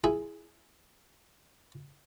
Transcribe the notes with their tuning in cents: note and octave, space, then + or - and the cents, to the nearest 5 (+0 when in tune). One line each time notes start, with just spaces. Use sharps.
E4 +5 G#4 +0